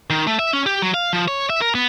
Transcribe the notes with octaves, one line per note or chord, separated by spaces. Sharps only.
D#3
A3
E5
C#4
G4
F#3
F5
F3
C#5
E5
A#4
B3